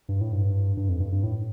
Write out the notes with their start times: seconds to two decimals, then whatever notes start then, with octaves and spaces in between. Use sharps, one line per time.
0.09 G2
0.21 A2
0.32 G2
0.77 G2
0.89 F2
1.00 G2
1.12 G2
1.23 A2